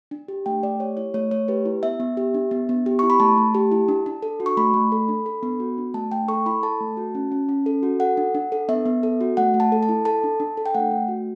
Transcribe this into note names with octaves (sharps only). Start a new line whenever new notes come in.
D4
G4
A3 G5
A3 D5
G4 C#5
E4 C#5
A3 C#5
A3 C#5
G4 B4
E4
B3 E5
B3
G4
D4
B3
B3
G4
E4 C#6
B5
A3 A5
A3
G4
E4
D4
D4
A4
F#4
C#6
A3 B5
A3
A4
D4
A4
B3
F#4
D4
A3 A5
A3 G5
A4 C#6
E4 B5
A4 A5
A3
F#4
C#4
C#4
C#4
A4
F#4
A4 F#5
D4
D4
A4
B3 E5
B3
A4
F#4
A3 F#5
A3
A5
A4
A5
E4
A4 A5
D4
D4
A4
G5
A3 F#5
A3
F#4